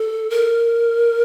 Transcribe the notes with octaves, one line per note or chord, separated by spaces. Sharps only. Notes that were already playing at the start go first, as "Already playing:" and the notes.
Already playing: A4
A#4